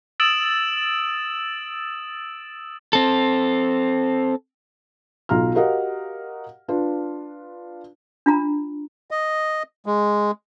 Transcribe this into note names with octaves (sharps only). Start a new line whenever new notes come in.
D#6 E6 A6 D7 E7 F#7
C4 A4
B1 F4 A#5 F6
F#4 G4 A#4 D#5 F5 F#5
D4 F4 B4
D4 F4 A#5
D#5
G#3